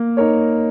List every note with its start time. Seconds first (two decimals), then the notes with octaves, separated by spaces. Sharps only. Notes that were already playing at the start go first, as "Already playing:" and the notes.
Already playing: A#3
0.17 D#4 A#4 C#5